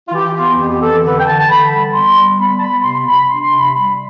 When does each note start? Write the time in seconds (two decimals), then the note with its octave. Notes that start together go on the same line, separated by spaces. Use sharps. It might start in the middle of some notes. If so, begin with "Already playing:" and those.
0.08 F4
0.14 E3 G4
0.36 B3 F4
0.59 F2 G4
0.71 G4
0.81 E3 A4
1.04 D3 B4
1.19 G5
1.26 D3 A5
1.39 A5
1.49 D3 B5
1.71 G3
1.93 B3 C6
2.16 G3
2.39 B3 B5
2.57 A5
2.61 B3 B5
2.83 C3 C6
3.06 C3 B5
3.28 D4 C6
3.43 C6
3.50 C3
3.59 B5
3.73 G3 B5